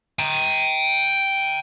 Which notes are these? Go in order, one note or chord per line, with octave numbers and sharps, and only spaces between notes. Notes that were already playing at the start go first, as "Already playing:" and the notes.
G5 A#5